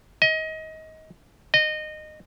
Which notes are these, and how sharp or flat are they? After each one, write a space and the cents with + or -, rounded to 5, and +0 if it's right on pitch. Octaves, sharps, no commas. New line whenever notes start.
D#5 +25
D#5 -20